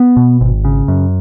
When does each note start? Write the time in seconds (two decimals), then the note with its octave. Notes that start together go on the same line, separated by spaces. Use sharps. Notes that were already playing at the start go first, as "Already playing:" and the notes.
Already playing: B3
0.17 B2
0.41 G#1
0.65 C#3
0.88 F#2